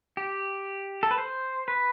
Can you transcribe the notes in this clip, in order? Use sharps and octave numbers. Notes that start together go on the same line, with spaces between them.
G4
A4
B4
C5
B4